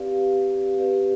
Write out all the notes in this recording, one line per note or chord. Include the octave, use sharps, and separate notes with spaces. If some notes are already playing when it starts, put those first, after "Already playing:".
Already playing: C4 G4 B4 D5 F5
C4 G4 B4 D5 F5